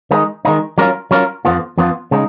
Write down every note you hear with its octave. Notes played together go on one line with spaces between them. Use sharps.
D#3 G#3 D#4
D#3 G#3 D#4
F#3 C#4 F4 A#4
F#3 C#4 F4 A#4
F2 F3 B3 F4
F2 F3 B3 F4
C#3 G#3 D#4